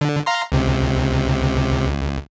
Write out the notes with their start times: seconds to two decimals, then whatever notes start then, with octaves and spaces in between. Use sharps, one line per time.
0.01 D3
0.26 F5 A#5 C6
0.52 C#2 C3
1.87 C#2